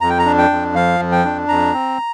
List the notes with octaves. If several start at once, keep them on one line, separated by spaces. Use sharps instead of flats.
F2 A#5
G5
A#5
D4
G5
F2
F3 F5
F2
G5
D4
F2 A#5
C4